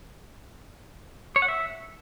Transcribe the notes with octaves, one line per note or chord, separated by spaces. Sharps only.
C#5
F#5
E5